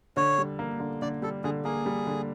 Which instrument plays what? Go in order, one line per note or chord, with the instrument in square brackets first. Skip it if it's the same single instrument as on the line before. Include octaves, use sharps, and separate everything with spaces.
[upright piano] D3 [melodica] C#5
[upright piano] G3
A#3
D3
[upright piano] D3 [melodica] D5
[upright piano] G3 [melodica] A4
[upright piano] D3 [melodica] G#4
[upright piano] A#3 [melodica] G#4
[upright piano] G3
D3